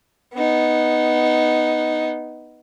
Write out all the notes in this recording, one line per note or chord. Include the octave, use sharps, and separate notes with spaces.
B3 D#4